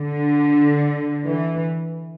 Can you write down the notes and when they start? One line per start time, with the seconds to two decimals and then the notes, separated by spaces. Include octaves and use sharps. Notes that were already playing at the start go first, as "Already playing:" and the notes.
Already playing: D3
1.26 E3